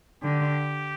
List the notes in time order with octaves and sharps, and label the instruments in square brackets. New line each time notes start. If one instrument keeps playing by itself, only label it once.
[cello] D3 [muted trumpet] G4